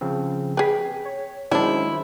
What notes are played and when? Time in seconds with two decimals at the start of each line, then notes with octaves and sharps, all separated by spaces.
0.01 C#3 F3 C4
0.57 G#4 B4 G5 B6
1.05 C#5
1.51 D#3 F#3 G#3 C#4 D4 E4 C5